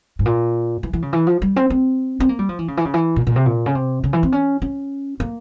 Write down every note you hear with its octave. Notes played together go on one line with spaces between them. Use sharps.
G#2
A#2
E3
E3
C#3
E3
F3
G3
C4
C4
C4
A#3
G3
F3
E3
C#3
E3
C#3
E3
A#2
A#2
C3
A#2
C#3
C3
C#3
E3
C4
C#4
C#4
A#3